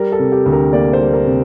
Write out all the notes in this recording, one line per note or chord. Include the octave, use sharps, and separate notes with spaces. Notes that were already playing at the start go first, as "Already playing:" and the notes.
Already playing: G3 A#4
A4
C3
G4
D2
A#4
A#3 D5
C5
G3
A#4
C3